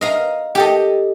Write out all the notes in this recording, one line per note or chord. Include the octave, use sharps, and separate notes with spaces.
D#5 F5 A#5
G4 A4 D#5